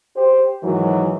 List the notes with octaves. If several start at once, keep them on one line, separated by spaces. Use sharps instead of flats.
G4 C5
G#2 D#3 E3 F#3